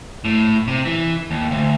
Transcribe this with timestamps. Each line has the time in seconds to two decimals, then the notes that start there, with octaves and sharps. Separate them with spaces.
0.25 A2
0.68 C3
0.85 E3
1.31 D#2
1.51 D2